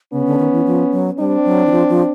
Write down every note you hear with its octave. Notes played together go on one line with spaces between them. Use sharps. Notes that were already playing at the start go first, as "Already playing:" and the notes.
C#3 B3 C#4
D3
D#3
E3
F3
F#3
G3 C4 D4
F#3
E3
F3
F3